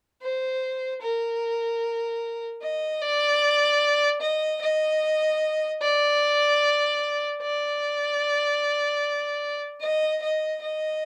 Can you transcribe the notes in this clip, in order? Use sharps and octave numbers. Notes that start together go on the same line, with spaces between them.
C5
A#4
D#5
D5
D#5
D#5
D5
D5
D#5
D#5
D#5